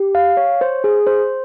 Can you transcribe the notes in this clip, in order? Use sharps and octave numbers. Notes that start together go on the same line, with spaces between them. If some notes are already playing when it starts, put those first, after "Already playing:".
Already playing: G4
F5
C#5
C5
G#4
C5